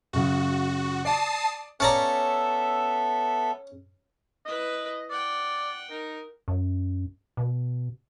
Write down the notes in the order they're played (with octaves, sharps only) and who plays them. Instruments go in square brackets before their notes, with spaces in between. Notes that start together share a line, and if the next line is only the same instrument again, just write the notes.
[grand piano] F#2 C#3 [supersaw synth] F#4
[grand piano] D5 [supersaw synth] A5 D#6 C7
[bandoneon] B3 A4 E5 [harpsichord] C#4 D5 A#5
[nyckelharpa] E4 B4 [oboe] D#5
[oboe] D5 [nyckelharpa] F#5 G5
[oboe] D#4 [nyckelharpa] A#4
[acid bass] F#2
B2